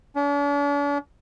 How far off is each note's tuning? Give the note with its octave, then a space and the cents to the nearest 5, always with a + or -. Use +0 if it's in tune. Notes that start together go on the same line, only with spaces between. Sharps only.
D4 -45